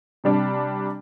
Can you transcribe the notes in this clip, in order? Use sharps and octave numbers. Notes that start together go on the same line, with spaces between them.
C3 G3 D4